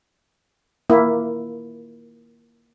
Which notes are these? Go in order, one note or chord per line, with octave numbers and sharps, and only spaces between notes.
A#3 E4